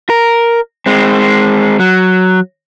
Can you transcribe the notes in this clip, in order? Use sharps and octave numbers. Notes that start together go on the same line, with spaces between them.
A#4
G#3 C4
F#3